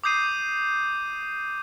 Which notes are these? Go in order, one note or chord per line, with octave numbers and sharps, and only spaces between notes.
D6 D#6 G6 C7 D#7